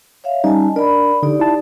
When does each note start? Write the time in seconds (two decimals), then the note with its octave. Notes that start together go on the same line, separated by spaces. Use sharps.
0.24 C#5 E5 F5
0.44 G3 C#4 D#4 D#5 G#5 A5
0.76 D4 A#4 D5 B5
1.23 D3 D#4 G4 D5
1.40 E4 A5